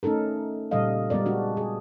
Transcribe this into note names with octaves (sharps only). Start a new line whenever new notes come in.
A3 C#4 D#4 A4 A#4
A#2 C#3 G3 A4 D#5 F5
G3 G#3 B3 A#4 D5
G#3 D4 F#4
G#4